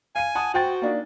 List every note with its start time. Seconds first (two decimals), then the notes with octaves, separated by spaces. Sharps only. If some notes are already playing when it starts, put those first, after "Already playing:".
0.16 F5 G#5 D#7
0.35 F#5 A5 D#6
0.54 F#4 C5 G5 A6
0.82 A#3 D4 D#4